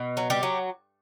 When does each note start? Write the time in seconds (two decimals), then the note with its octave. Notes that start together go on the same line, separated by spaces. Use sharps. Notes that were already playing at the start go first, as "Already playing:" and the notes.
Already playing: B2
0.17 F#3
0.30 G3 G4
0.43 F#3